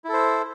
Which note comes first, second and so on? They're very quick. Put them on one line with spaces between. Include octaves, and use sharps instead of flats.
E4 A4 C5